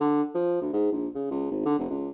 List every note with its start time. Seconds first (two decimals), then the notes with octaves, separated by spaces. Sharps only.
0.01 D3
0.35 F3
0.61 D2
0.73 G#2
0.92 A#1
1.15 C#3
1.31 C#2
1.51 G#1
1.66 D3
1.79 F1
1.90 C#2